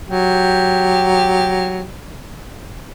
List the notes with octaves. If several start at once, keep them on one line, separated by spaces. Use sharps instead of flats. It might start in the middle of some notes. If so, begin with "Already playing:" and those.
F#3 G4